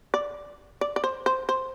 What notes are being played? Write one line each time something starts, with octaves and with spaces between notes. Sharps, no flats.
D5
D5
D5
C5
C5
C5